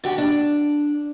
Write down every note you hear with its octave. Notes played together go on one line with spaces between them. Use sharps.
D3 F#4 G4
D4